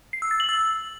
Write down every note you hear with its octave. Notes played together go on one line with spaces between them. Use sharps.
C7
E6
A6
F#7
E6